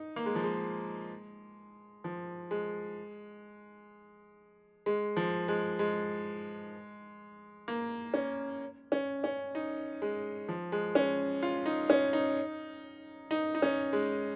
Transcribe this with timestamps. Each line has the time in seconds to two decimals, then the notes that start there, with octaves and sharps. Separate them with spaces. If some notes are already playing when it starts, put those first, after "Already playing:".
Already playing: D#4
0.16 A#3
0.26 G#3
0.35 F3
0.44 G#3
2.04 F3
2.51 G#3
4.86 G#3
5.17 F3
5.48 G#3
5.79 G#3
7.68 A#3
8.14 C#4
8.92 C#4
9.24 C#4
9.55 D#4
10.02 G#3
10.49 F3
10.72 G#3
10.95 C#4
11.43 F4
11.66 D#4
11.90 C#4
12.13 D#4
13.31 D#4
13.55 D#4
13.62 C#4
13.93 G#3